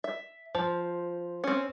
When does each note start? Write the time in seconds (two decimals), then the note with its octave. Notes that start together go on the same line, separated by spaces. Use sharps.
0.04 E5
0.55 F3 C5
1.44 C4 C#4